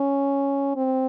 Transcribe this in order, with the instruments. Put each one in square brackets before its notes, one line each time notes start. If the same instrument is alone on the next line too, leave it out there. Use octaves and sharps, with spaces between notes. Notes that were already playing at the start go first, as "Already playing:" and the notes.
Already playing: [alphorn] C#4
C4